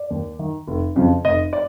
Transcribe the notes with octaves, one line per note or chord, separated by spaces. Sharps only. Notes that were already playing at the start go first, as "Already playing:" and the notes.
Already playing: D5
D#2
D#3
F1
F2 C#3 F3
F1 D#5
D5